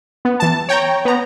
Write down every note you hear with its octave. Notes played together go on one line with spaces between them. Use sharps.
B3
E3 A5
C#5 G5 A#5
B3 A#5